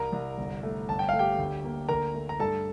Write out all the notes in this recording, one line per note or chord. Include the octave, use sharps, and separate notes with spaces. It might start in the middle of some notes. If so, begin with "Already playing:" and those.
Already playing: C2 A#4 A#5
C2
G1
A3
G1 A5
G5
A3 F5
G4 G5
D2
A#3
D2 A#4 A#5
A3
A#5
G2 A4 A5